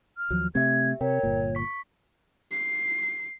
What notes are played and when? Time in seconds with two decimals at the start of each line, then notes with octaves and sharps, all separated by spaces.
0.18 F6
0.31 D#2 F3 F#3
0.55 C3 A3 C4 G4 E5 G#6
1.01 C3 A#4 C#5 G5
1.23 G1 A#2
1.55 C#6 B6
2.51 C7